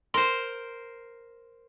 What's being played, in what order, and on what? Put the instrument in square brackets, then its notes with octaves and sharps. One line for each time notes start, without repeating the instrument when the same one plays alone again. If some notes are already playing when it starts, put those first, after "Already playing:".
[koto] A#4 C5 [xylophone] C6